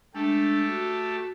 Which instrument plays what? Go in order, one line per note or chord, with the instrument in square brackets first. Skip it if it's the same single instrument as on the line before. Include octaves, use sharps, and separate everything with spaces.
[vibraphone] G#3 D4 [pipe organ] A3 G4 A4
[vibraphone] F#4